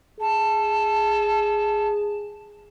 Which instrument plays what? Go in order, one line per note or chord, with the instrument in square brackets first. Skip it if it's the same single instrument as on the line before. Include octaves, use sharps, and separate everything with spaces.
[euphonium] G#4 [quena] A5